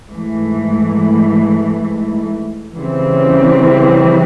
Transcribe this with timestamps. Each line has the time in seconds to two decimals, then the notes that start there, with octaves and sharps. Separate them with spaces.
0.10 G#2 E3 A3
2.74 C#3 E3 G3 C4